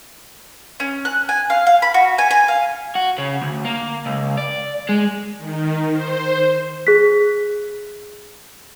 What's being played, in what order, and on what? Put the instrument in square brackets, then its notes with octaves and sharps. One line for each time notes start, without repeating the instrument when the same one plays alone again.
[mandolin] C#4
F#6
G#5
F5
F5
B5
F#4
G#5
G#5
F5
[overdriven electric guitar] F#4
C#3
D2
A#3
C#2
D5
G#3
[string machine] D#3
C5
[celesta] G#4 F#6 B6